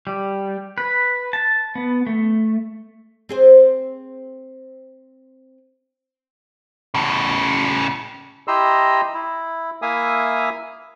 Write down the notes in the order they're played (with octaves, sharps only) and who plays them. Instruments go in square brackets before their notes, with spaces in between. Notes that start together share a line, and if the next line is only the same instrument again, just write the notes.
[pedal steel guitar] G3
B4
A5
B3
A3
[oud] C4 G#4 C5
[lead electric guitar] A2 C#3
[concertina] E4 G4 D#5 A#5 C6 E6
E4
A#3 E4 E5 F5 G#5 D#6